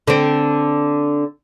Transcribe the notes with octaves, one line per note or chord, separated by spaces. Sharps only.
D3 C4